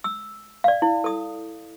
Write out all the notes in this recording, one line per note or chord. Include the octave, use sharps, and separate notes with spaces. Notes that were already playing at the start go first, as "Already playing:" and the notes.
E6
D5 F5
E4
A4 D#6